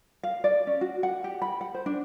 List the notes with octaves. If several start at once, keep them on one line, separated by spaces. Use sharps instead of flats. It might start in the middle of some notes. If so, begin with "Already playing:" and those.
F5
D5
C#4
F#4
F#5
G4
B5
F#5
C5
D4